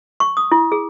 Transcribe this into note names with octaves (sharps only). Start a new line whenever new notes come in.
C#6
D#6
E4
G#4